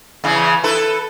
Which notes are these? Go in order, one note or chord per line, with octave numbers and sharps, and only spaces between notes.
E2 C#3 E3
E4 A4 B4